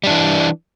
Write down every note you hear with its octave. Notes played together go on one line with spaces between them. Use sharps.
E3 G3 D4